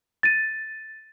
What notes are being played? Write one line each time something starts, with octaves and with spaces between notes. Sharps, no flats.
A6 D#7